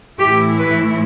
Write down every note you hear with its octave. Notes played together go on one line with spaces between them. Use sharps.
A2 E3 A3 E4 G4
B4